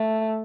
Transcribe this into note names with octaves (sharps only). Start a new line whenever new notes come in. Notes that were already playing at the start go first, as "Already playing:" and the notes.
Already playing: A3